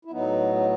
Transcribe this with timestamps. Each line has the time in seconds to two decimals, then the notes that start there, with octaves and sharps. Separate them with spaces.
0.05 E4
0.11 A2 F#3 B3 D#4
0.56 D#4